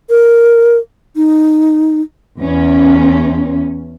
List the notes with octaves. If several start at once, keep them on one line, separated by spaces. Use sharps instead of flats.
A#4
D#4
E2 C#4